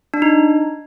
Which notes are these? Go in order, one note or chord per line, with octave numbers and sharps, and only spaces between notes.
D4
D#4